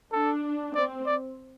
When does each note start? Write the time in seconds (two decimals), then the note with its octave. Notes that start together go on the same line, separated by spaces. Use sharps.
0.12 D4 A4
0.75 C4 D5
1.06 D5